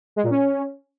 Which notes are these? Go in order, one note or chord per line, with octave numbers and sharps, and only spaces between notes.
G#3
A#2
C#4